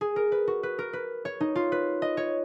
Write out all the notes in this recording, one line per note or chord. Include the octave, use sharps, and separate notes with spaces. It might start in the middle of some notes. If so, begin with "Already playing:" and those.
G#4
A#4
B4
F#4
B4
A#4
B4
C#5
D#4
F4
B4
D#5
C#5